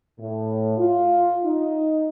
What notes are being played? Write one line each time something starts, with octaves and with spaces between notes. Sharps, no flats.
A2
F4
D#4